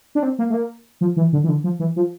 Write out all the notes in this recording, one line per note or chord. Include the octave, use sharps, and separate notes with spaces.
D4
C4
A#3
A3
A#3
F3
E3
D3
E3
D3
F3
E3
F3